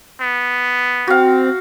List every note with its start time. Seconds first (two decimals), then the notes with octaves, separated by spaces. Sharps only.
0.21 B3
1.08 C4 F#4 F5